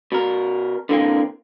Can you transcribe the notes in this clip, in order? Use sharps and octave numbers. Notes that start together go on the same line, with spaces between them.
B2 A#4
D3 E3 A#3 C4